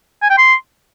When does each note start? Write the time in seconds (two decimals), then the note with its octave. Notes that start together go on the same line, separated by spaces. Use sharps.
0.22 G#5
0.30 G5
0.38 C6